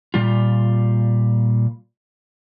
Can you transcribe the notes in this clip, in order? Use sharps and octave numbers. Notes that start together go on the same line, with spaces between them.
A#2 G3 F4